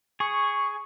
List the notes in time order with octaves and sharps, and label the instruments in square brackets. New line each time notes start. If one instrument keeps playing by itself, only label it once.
[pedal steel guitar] G#4 [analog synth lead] C#6